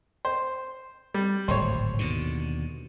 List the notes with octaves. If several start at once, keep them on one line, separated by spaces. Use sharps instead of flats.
C5
G3
D1 G#1 C5 C#5
D#2 B2 D3